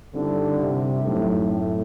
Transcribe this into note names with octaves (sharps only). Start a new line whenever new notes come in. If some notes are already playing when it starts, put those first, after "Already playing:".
G2 D3 D#3 G3 C4 E4
C3
F#2 A2 D#3 F#3 A3 C4
A2